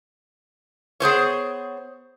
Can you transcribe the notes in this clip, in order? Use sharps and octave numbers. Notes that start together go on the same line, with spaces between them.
B3 G#4 C5 C#5